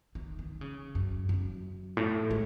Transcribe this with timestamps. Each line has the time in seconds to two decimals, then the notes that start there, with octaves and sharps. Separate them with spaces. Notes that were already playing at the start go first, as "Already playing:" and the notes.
0.15 D#3
0.39 D#3
0.61 C#3
0.95 F#2
1.29 F#2
1.97 A2
2.31 G#3